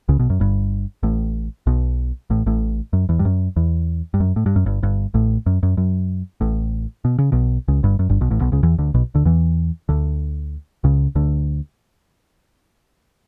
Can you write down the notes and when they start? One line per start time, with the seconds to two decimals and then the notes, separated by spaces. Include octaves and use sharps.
0.09 C#2 C#3
0.19 B1 B2
0.30 F#2
0.40 G1 G2
1.03 A1 A2
1.67 B1 B2
2.30 A1 A2
2.46 A1 A2
2.93 F#2
3.09 E2
3.19 G2
3.25 F#2
3.56 E2
4.14 G2
4.20 F#2
4.36 A2
4.46 G2
4.56 F#2
4.66 G1 G2
4.83 G1 G2
5.14 A1 A2
5.46 F#2
5.63 F#2
5.77 F#2
6.41 A1 A2
7.05 B2
7.19 C#3
7.32 B1 B2
7.68 C#2 C#3
7.83 G1 G2
7.99 F#2
8.09 G1 G2
8.21 B1 B2
8.30 A1 A2
8.41 B1 B2
8.52 C#2 C#3
8.63 E2 E3
8.78 D2 D3
8.94 B1 B2
9.15 D2 D3
9.25 E2 E3
9.89 D2 D3
10.84 C#2 C#3
11.15 D2 D3